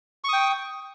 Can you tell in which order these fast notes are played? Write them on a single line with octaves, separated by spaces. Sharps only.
C#6 D#6 G5